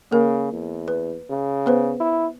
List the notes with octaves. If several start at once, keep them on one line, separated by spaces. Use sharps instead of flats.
C#3 A#3 A#4
E2
B4
C#3
B3 B4 C5
E4